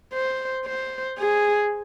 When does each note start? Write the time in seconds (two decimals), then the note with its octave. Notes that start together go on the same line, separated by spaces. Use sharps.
0.13 C5
0.66 C5
1.19 G#4